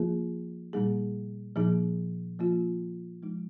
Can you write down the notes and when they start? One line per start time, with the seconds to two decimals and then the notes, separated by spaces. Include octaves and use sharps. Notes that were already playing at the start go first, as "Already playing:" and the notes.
Already playing: F3 A#3 F4 G#4
0.73 A#2 G3 A#3 D#4 G#4
1.56 A#2 F3 A#3 D#4 G#4
2.39 F3 A#3 F4
3.22 F3 G#3 D#4